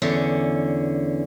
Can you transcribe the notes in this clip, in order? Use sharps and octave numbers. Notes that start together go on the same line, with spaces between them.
E2 D3 C#4